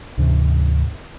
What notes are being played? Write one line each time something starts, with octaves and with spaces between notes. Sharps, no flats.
D2 G#2 C3 E3